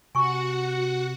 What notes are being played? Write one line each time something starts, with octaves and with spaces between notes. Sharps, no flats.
C3 F#4 F#5 G#5 C#6